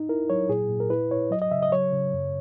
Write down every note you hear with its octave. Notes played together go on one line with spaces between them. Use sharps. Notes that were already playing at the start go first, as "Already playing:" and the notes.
Already playing: D#4
E4 A#4
F#3 C#5
A#2 G#4
A#2
A#4
E4 B4
E4 C#5
F#3 D#5
D#5
C#3 E5
D#5
F#3 C#5
C#3
F#2